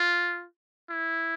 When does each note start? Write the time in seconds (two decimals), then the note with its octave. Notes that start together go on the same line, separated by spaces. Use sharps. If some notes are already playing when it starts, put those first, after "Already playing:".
Already playing: F4
0.90 E4